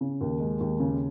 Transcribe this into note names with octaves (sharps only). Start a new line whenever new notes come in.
C#3
D#2
G#3
D#2
C#3